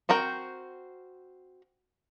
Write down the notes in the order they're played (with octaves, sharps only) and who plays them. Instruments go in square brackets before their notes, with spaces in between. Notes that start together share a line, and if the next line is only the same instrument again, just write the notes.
[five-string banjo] C4 F#4 A#4 G5